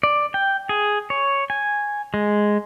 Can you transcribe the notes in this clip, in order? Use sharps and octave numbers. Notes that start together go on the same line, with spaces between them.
D5
G5
G#4
C#5
G#5
G#3